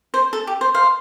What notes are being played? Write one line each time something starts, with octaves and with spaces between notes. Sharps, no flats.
C5
A4
G4
C5
C5 F5